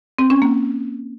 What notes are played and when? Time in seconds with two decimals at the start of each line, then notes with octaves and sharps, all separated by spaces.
0.19 C4
0.30 C#4
0.42 A#3